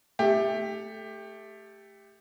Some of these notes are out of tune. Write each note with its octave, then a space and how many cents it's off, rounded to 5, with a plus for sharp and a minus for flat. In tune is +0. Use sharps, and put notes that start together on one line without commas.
A3 -5 G4 +15